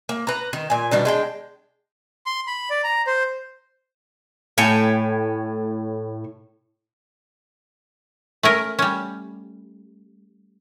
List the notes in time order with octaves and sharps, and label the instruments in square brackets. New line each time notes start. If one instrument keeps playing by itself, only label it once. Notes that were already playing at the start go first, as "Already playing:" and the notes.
[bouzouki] A#3
B4 A#5
D#3
A#2 G#5
B2 D#3 G3 D4
G#3 D4 G5
[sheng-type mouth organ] C6
B5
D5
A#5
C5
[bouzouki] A2 C#5 G5 G#5
[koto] A3 C#4 A#4
G3 C#4